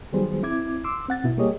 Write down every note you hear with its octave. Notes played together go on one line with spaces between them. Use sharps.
D#3 F#3 G3 B3 G#4 C5
C4 E4 D6 G#6
C6 D6 E6
C4 F#5 A6
B2 B3 E4
G3 A#3 G4 G#4 C#5 D#5